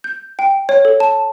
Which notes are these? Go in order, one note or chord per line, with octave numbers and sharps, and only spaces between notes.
G6
G5
C#5
A4
A5